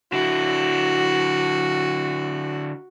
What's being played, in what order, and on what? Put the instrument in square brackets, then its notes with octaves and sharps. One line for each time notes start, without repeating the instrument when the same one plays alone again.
[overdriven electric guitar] D3 E4 [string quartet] F#4